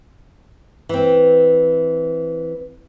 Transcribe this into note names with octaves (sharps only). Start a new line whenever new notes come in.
E3 C4